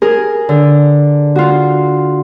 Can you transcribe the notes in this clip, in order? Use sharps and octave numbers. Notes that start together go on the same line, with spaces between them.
G#4 A#4
D3
F4 F#4